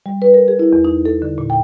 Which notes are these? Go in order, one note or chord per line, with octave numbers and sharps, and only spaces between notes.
G3
B4
A#4
G#4
E4
E2
D#4
A4
D3
A#2
G5